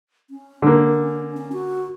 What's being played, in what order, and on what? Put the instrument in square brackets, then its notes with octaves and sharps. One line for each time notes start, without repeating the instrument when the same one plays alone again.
[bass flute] C#4
[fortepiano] D3 A#3
[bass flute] C#4
F#4